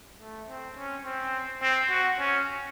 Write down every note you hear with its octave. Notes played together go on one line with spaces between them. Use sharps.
A3
C4
C#4
C4
C4
F#4
C#4